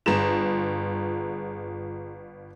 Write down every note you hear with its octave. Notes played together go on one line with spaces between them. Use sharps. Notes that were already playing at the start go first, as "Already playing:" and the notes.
G1 F4 G#4 A#5 E7